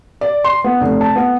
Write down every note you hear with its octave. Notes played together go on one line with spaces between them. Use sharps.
D5
C6
B3
F1
A5
B3